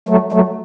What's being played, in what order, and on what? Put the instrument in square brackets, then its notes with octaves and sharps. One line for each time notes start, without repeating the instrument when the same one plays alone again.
[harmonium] F#3 A3
F#3 A3